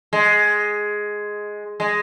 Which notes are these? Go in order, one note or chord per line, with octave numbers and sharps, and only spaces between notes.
G#3
G#3